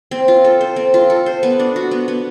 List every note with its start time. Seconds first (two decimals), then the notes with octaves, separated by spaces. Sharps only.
0.11 C4
0.28 F4
0.45 A4
0.61 C5
0.76 C4
0.94 F4
1.10 A4
1.26 C5
1.43 B3
1.59 D4
1.76 F#4
1.91 B3
2.08 B3